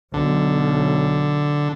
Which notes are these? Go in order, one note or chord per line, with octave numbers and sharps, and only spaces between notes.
B1 D3